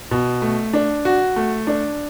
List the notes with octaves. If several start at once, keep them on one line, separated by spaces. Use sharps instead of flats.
B2
A3
D4
F#4
A3
D4